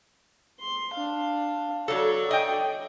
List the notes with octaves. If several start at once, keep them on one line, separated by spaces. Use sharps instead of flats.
C6
D4 F5
F#3 A4 C#5 D5
D#5 G5